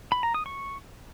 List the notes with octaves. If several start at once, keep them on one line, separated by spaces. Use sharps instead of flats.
B5
A#5
D#6
C#6